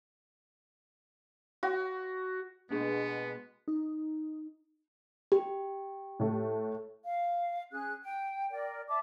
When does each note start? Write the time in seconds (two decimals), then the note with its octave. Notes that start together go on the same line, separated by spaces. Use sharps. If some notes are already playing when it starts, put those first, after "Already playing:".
1.63 F#4
2.71 B2 G#3 A#3 B3 D4 G#4
3.68 D#4
5.32 G4
6.19 A2 A3
7.04 F5
7.72 C#4 G#4 F#6
8.04 G5
8.50 A#4 D5 G5
8.88 D5 E5 A5 D6